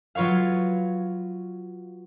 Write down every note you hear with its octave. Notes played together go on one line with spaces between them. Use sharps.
F#3 F4 B4 C#5 F5